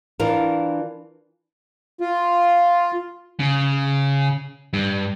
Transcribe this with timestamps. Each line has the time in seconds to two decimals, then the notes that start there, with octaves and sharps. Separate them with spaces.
0.20 E3 D4 F4 A#4
2.00 F4
3.40 C#3
4.73 G2